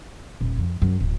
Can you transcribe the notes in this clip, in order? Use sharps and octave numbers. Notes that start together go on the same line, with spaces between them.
D#1
F2
F#2
D1